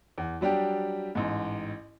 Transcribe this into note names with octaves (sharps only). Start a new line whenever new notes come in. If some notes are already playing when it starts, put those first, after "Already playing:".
E2
F#3 G3 D4 G4
A1 G#2